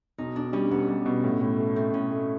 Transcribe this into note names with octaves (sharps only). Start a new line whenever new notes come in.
B1 D#4
B1 D4
G3 C#4
B1 B3
G3
B2
A2
A2
A3
A3 C4
A2 C#4
A3